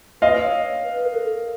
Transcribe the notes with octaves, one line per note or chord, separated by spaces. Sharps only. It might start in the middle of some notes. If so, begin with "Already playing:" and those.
B4 D#5 F5
C#5
B4
A#4
A4
A#4